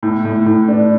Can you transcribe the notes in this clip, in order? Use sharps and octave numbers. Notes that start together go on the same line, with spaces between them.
A2
A2
A2
D4